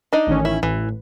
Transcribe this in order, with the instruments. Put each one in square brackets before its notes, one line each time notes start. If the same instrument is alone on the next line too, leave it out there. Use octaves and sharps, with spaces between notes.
[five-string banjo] D4 D#4 D#5
[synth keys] A1 D#3 C#4
[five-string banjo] E4
[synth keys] A1 [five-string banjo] E3